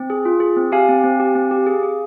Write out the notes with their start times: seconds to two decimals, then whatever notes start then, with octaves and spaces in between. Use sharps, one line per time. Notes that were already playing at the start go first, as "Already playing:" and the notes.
Already playing: C4
0.10 G#4
0.25 F4
0.40 G#4
0.56 C4
0.72 G4 F5 G#5
0.89 C4
1.04 C4
1.20 G4
1.35 C4
1.51 G4
1.66 G#4
1.83 G#4